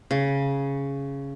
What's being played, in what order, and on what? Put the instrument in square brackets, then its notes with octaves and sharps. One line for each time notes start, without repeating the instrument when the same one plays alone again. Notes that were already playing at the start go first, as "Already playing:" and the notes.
[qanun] C#3